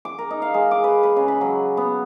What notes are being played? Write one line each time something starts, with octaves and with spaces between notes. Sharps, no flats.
D6
A#4
D#4
F5
G#3
D6
B4
B4
C#3
B5
F#3
B3